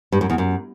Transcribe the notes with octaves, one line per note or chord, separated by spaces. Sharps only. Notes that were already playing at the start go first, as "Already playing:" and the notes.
G2
F#2
E2
F#2